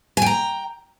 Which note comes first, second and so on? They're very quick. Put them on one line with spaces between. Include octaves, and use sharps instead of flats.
G#5 G5 A#5